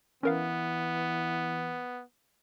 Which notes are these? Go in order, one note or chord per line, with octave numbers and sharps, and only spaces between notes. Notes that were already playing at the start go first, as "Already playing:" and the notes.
E3 B3 C#4 A#4 F5